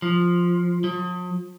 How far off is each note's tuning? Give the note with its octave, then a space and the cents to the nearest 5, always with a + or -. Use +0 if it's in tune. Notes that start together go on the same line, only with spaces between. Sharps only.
F3 +5
F3 +45